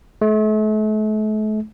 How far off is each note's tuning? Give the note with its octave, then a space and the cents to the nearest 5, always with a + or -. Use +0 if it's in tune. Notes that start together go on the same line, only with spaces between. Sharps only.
A3 -40